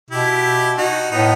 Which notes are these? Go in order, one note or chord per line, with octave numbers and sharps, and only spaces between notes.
B2 E4 G4
D#4 F#4
A2 B3 D#4